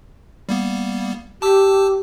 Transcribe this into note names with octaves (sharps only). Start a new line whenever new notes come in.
G3 A#3 B3
G4 A5 D6 E6